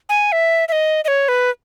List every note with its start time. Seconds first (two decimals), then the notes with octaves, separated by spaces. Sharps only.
0.09 G#5
0.32 E5
0.68 E5
0.72 D#5
1.05 D#5
1.08 C#5
1.28 B4